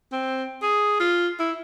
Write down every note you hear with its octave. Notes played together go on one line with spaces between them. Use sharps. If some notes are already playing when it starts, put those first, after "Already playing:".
C4
G#4
F4
E4